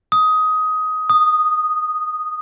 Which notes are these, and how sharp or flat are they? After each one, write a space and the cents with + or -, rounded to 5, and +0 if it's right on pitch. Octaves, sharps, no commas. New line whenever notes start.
D#6 +15
D#6 -10